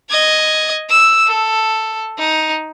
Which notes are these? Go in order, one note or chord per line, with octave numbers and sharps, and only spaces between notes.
D#5 G#6
E6
A4
D#4